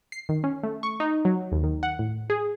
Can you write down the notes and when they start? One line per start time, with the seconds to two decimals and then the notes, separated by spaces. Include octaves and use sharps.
0.12 C7
0.29 D#3
0.44 C#4
0.63 A3
0.83 C#6
1.00 D#4
1.25 F#3
1.52 D#2
1.64 D#3
1.83 F#5
1.99 A2
2.30 G#4